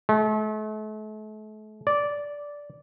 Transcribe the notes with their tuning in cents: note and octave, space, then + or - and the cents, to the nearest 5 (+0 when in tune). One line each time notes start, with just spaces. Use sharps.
A3 -40
D5 -10